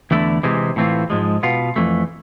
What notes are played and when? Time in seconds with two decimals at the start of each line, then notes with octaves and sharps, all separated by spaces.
0.11 E2 D3 A3 E4
0.43 C3 E3 G#3 C4
0.76 A2 E3 A3 C4 F4
1.10 G#2 F3 G#3
1.43 B2 B3 F4
1.76 F2 E3 A3